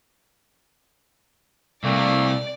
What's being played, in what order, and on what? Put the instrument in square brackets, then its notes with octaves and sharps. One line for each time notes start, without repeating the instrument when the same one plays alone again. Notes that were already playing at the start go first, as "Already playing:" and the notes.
[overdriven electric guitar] C2 C3 [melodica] A3 A#3 [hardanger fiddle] D5